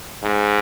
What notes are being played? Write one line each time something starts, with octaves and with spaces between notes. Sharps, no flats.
G#2